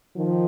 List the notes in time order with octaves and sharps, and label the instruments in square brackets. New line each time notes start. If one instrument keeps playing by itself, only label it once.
[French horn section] D#3 F3